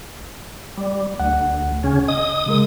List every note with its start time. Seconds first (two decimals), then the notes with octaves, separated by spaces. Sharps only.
0.78 G3
1.20 D2 F#5
1.84 C#3 C#4
2.08 D#5 D#6
2.46 C#3 G#3 A#4